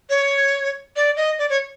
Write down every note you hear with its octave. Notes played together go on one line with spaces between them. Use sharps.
C#5
D5
D#5
D5
C#5